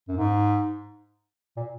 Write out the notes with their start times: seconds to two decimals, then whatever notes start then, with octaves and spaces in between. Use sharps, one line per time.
0.08 F#2
0.17 G#2
1.57 A#2